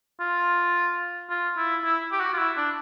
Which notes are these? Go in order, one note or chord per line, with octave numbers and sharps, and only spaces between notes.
F4
F4
E4
E4
G4
F#4
F4
E4
D4